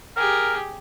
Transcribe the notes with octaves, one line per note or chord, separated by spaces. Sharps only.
G4 G#4 A#4